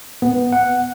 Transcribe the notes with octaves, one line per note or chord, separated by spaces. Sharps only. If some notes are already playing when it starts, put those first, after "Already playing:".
B3
F#5